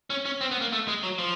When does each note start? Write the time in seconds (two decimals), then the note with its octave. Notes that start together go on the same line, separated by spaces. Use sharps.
0.10 C#4
0.25 C#4
0.41 C4
0.51 B3
0.61 A#3
0.72 A3
0.88 G#3
1.03 F#3
1.18 F3